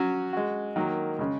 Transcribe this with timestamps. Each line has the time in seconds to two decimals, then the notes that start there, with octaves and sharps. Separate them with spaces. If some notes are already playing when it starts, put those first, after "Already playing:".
Already playing: F#3 C#4 F#4
0.33 G#3 F#4
0.76 D#3 F#3 A#3 F#4
1.19 C#3 G#3 C#4